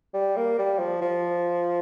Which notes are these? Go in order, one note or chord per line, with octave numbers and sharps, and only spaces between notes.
G3
A#3
G3
F3
F3